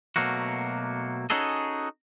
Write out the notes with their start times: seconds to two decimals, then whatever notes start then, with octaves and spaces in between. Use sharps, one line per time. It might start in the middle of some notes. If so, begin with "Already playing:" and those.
0.16 B2 F#3 A3 A#3 F#4
1.30 C#4 D#4 F#4 G#4 A4 D#5